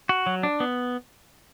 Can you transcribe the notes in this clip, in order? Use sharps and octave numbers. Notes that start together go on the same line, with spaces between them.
F#4
F#3
D4
B3